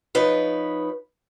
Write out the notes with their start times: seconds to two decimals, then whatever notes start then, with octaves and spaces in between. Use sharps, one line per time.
0.15 F3 D#4 B4 C#5